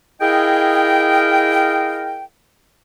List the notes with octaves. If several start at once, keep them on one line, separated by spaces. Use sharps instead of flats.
E4 G#4 A#4 D#5 F5 G5